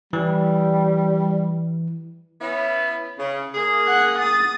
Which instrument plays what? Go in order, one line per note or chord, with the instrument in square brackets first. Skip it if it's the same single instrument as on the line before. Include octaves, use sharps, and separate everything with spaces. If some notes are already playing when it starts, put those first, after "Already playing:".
[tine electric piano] E3 [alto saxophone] G3
[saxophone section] B3 C#4 E4
C#3
A#3 G#4
[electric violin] F#5 F#6
D#6 A6